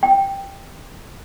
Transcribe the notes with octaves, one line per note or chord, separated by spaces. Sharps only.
G5